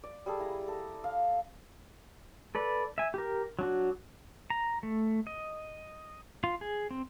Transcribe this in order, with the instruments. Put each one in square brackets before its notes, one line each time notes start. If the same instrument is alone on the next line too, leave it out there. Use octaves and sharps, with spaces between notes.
[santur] D5
G3 G#4 A4
E4 A#5
A4 A#5
F5
[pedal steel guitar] A4 B4 D5
E5 G#5
G4 A#4
F#3 D4 F#4
A#5
A3
D#5
F4
G#4
C4